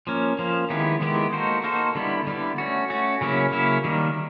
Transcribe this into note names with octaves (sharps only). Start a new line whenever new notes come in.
F3 A#3 C#4
F3 A#3 C#4
D#3 G#3 B3 E4 G4
D#3 G#3 B3 E4 G4
A#3 D#4 F#4 A4 C5
A#3 D#4 F#4 A4 C5
D3 G3 B3 E4
D3 G3 B3 E4
A3 C#4 F#4
A3 C#4 F#4
C#3 F#3 A#3 C#4 E4
C#3 F#3 A#3 C#4 E4
D#3 G3 A#3